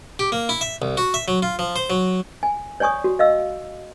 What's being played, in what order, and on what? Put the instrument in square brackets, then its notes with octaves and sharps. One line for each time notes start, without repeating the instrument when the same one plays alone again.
[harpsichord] G4
A#3
E4
E5
C2
F#4
E5
F#3
F4
F3
C5
F#3
[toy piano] G#5
C#5 D5 G#5 C#6 D#6
F#4
D#5 F5 E6